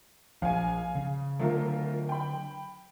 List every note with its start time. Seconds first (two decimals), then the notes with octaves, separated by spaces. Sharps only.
0.42 A#1 F3 F5 G#5
0.95 C#3
1.39 D3 F#3 A3 F4 A#4
2.09 G5 B5